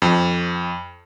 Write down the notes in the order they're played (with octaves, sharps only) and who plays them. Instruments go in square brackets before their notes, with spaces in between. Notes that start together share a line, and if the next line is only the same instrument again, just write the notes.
[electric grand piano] F2